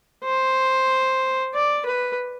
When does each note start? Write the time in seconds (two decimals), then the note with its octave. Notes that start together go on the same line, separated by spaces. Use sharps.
0.24 C5
1.54 D5
1.86 B4